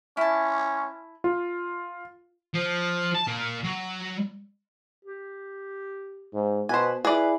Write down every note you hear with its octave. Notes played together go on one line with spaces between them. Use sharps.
C#4 E4 A5
F4
F3
A5
A#3 F4
F#3
G4
G#2
B2 B4 C5 G#5
E4 G#4 B4 D5